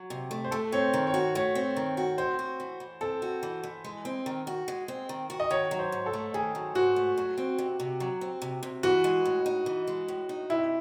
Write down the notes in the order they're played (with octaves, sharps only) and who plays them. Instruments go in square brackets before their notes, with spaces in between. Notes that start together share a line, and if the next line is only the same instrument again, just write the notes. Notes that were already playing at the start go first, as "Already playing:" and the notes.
Already playing: [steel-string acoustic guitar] F#3
C3
A3
[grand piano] C5
[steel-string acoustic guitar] A3 [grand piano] A4
[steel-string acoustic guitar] C4 [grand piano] C#5
[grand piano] C5
[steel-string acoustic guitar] D#3
[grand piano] C#5
[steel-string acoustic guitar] F#4
[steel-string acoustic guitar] A3 [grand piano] C#5
[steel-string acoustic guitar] C4
D#3
F#4
[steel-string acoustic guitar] C4 [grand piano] C5
[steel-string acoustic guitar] F#4
E3
E3
[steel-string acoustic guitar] C4 [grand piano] A4
[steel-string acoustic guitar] F#4
E3
E3
G#3
C4
D#3
F#4
G#3
C4
D#3
F#4
[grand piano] D#5
[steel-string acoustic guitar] D#3 [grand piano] C#5
[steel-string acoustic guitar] F#3
[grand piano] C5
[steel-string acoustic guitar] G#2
[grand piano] A4
[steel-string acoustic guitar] A3
[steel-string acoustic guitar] D#3 [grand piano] G#4
[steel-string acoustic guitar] F#3
[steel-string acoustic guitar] G#2 [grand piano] F#4
[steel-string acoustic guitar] A3
F#3
C4
C3
C3
F#3
C4
C3
C3
[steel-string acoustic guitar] E3 [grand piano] F#4
[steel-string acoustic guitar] G#3
A2
D#4
E3
G#3
A2
D#4
[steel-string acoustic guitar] C3 [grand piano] E4